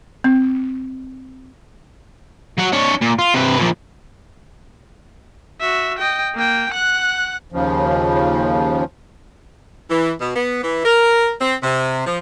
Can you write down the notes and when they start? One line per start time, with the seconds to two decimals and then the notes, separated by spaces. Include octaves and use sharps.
0.24 C4
2.58 F#3 F#5
2.73 D4 C#5
3.02 A#2
3.19 F4
3.34 C3 B4
3.58 A#2 F3
5.61 F#4 E5
5.99 D#5 G5
6.35 A#3 G5
6.72 F#5 F#6
7.52 D#2 C#3 F3
9.90 E3
10.21 B2
10.35 B3
10.63 E3
10.85 A#4
11.41 C4
11.63 C3
12.07 F3